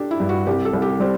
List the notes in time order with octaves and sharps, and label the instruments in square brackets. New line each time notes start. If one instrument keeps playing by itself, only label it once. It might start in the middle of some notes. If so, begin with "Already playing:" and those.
Already playing: [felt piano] D4 G4 A4
E4
[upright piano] G2
[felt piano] F#4
[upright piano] C2 [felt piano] G4
[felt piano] A4
[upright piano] C2
[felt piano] G4
[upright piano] G3 [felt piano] C4